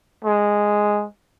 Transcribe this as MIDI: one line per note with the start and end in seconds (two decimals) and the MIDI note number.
0.25 1.06 56